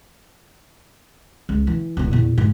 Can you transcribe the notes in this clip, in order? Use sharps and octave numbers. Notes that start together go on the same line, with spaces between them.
C#2
E3
D1 B3
E2 A#2
G#2